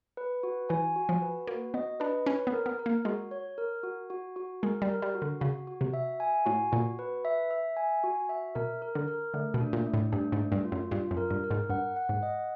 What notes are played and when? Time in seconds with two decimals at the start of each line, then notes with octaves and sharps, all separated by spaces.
0.17 B4
0.43 F#4
0.69 E3 G#5
0.96 F#4
1.09 F3
1.22 B4
1.47 A#3 F#4
1.74 B3 D#5
2.00 D4 B4
2.26 C#4 C#5
2.47 B3
2.53 A#4
2.66 B3
2.79 A#4
2.86 A#3
3.05 G#3 F#4
3.31 C#5
3.58 A#4
3.83 F#4
4.10 F#4
4.36 F#4
4.63 G#3 A#4
4.82 G3
4.89 A#4
5.02 G3
5.14 F#4
5.22 D3
5.41 C#3 F#4
5.67 F#4
5.81 C3
5.93 E5
6.20 G#5
6.46 A2 F#4
6.72 A#2 F#4
6.99 B4
7.25 E5
7.51 E5
7.77 G#5
8.04 F#4
8.29 E5
8.55 B2 A#4
8.82 A#4
8.95 D3
9.08 A#4
9.34 D3 A3
9.54 B2
9.60 D4
9.73 A#2
9.86 A3
9.94 A2
10.12 G2 D4
10.32 G#2
10.39 A3
10.52 G2
10.65 F4
10.72 F#2
10.91 G2 F4
11.11 F#2
11.17 A#4
11.31 G2
11.44 A#4
11.51 G#2
11.70 G2 F#5
11.96 F#5
12.09 G#2
12.23 D#5